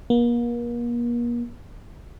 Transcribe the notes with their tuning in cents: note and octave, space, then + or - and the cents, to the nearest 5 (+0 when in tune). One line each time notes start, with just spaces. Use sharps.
A#3 +40